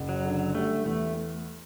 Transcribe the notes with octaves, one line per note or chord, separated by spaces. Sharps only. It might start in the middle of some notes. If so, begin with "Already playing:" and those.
Already playing: F#1
F#3
D3
G3 A3
E2 A3